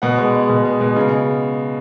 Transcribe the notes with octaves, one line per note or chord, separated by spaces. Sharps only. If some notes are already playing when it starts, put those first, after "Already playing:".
B2 F#5
G#3
G#3
B2
G#3
B2
C#3